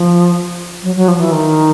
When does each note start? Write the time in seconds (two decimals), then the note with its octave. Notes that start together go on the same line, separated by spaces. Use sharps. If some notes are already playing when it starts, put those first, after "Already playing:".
Already playing: F3
0.83 F#3
0.96 F#3
1.08 F3
1.19 E3
1.32 D#3